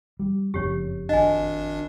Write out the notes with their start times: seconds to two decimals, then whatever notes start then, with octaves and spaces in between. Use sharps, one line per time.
0.20 G3
0.54 F#1 F2 C#3 G4 C#5
1.09 G#1 D4 D#5 G#5